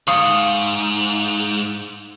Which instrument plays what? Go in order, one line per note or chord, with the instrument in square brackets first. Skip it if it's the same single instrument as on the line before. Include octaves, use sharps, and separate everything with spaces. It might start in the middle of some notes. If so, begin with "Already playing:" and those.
[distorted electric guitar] G#2 [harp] F5 C#6 D#6